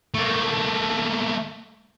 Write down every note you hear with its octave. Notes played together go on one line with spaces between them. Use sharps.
A3 A#3